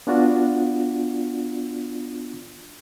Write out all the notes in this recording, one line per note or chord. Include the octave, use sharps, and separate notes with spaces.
B3 D4 F4 F#4 D5